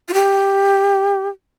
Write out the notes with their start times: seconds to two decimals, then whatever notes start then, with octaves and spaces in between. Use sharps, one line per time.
0.09 F4
0.14 G4